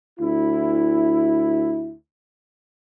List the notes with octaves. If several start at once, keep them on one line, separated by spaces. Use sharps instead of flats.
D2 E4